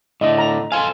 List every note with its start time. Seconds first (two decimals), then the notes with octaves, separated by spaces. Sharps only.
0.21 A2 D3 A3 D#5
0.38 A#5
0.72 A4 C5 F5 G#5